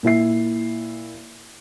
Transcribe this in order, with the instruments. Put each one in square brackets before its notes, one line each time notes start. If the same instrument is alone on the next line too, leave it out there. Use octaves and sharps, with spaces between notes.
[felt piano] A#2 E4 E5 C7